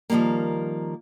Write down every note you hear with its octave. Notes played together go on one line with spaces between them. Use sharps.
D#3 F3 G3 G#3 A#3